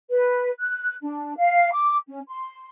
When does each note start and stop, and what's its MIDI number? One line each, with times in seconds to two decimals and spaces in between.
0.10 0.49 71
0.59 0.95 90
1.02 1.36 62
1.37 1.72 77
1.72 1.97 86
2.07 2.20 61
2.28 2.69 84